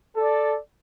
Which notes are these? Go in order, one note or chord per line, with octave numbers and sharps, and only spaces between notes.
A4 D5